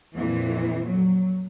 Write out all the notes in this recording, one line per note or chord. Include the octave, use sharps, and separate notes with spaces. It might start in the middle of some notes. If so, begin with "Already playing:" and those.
F2 A#2 E3
F#3